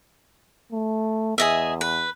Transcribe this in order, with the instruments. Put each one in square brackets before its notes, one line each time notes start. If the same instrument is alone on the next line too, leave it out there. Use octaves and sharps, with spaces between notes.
[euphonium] A3
[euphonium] E2 [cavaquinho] G#4 D#5 E5
[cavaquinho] B4